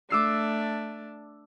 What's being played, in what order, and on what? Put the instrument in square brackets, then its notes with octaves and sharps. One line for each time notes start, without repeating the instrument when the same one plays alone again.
[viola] A3 D4 [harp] D6 E6 C7